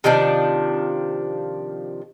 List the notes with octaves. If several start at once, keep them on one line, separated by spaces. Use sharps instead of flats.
C3 D#3 F3 D4